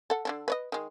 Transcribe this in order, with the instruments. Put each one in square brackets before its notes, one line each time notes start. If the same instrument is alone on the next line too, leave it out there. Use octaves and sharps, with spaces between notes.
[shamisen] A4 F#5
D3 D4 A4
B4 C#5 D#5
D#3 G#3